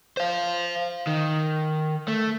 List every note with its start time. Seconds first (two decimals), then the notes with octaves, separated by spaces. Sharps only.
0.17 C5 F5
1.07 D#3
2.08 A3